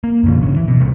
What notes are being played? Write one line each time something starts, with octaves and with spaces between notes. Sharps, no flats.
A#3
F#2 B2 D3 F3
G#1 C#3
E3
B2
A1 C3 G3 B3